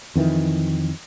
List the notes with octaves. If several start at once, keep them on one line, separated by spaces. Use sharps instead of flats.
F2 D#3 E3